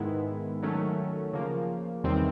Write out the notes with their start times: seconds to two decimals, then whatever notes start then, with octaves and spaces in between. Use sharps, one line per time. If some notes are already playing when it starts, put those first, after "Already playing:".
Already playing: G#2 D#3 G#3 B3 E4
0.62 D#3 F#3 A3 C#4
1.33 C#3 F3 A#3
2.04 E2 C3 D#3 G3 C4